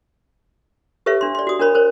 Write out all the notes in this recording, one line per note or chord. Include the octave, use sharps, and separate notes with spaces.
G4 A4 B4 C#5 E5
D4 C6
D5 C6
F#4 D#6
D4 A#4 C#5 B5
A#4 C5 C#5